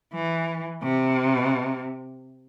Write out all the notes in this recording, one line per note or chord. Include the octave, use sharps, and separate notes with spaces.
E3
C3